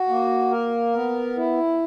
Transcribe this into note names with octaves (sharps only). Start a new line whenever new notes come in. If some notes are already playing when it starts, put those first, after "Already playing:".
Already playing: F#4
A#3
A#4
B3
E4